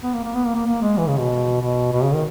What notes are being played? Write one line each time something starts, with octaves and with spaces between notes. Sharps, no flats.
B3
A#3
A#3
B3
A#3
A#3
A#3
G#3
E3
C#3
B2
B2
B2
C#3
D#3